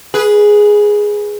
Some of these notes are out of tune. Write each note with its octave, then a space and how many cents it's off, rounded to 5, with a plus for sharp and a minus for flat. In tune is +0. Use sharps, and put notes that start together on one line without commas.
G#4 +0 B4 -20